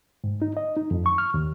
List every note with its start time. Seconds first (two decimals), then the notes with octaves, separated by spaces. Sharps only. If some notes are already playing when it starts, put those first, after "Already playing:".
0.24 G#2
0.42 D#4
0.57 D#5
0.77 D#4
0.91 F2
1.06 C#6
1.18 F6
1.34 D#2